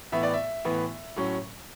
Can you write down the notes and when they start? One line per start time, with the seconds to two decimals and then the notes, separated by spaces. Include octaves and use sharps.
0.12 A2 E3 B3 E5
0.23 D5
0.34 E5
0.65 A2 E3 B3
1.16 A2 F#3 C#4